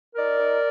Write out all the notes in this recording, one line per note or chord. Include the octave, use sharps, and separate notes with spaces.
D#4 A#4 D5
D#4